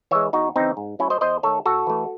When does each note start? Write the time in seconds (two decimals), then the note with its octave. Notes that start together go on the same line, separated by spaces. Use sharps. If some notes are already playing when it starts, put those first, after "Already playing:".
0.11 E3 G#3 C#5 E5
0.33 E2 D#4 F#4
0.56 C#3 E3 C4 D#4
0.77 G#2
0.99 F#3 A3 C#4 E4
1.10 C5 D#5
1.21 E2 C5 D#5
1.43 D#3 A3 A4 C#5
1.66 A2 F#4 A4
1.87 E3 A3